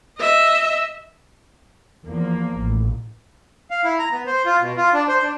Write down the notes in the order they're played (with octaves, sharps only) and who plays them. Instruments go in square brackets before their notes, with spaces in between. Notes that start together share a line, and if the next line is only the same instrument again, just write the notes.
[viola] D#5 E5
[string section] E2 F3 A#3
A1
[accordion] F5
E4
A#5
B3
C5
F4
B2
F4
D4
C5
D4